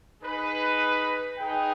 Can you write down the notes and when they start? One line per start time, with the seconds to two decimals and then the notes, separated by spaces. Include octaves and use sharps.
0.22 D#4 G#4 B4
1.37 D#4 G#4 B4 G5